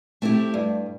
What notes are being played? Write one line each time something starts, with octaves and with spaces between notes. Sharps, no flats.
A3 C4 E4 G4
G2